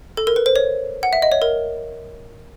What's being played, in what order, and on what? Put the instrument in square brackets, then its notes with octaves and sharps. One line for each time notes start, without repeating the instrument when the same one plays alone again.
[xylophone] A4
A#4
B4
C5
C#5
F#5
E5
D#5
C#5
A#4